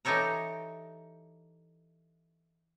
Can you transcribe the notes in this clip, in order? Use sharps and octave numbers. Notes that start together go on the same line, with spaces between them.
E3 D#4 G4 A4 C#5 A#5